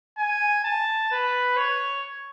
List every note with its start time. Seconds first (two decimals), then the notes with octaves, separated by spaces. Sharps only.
0.18 G#5
0.64 A5
1.11 B4
1.57 C#5